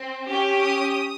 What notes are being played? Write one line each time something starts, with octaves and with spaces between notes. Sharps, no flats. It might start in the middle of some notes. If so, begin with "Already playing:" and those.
Already playing: C4
C#4 G4
D#6